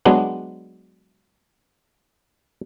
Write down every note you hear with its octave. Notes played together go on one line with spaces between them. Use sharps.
F#3 G#3 B3 D4